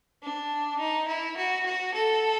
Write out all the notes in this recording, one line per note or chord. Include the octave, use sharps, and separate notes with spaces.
D4
D#4
E4
F#4
F#4
A4